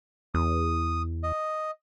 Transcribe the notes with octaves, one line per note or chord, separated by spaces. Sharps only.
E2 D#6
D#5